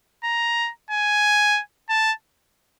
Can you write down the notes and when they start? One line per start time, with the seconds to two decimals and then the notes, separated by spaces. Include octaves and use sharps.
0.24 A#5
0.91 G#5
1.89 A5